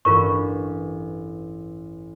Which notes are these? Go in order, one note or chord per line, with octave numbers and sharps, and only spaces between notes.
A1 G2 F4 A#4 C#6